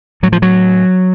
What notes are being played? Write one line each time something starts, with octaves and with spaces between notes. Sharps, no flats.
A2 F#3
F3
F#3